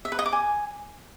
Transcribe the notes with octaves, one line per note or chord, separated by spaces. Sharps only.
E5
B4
D#5
D6
G#5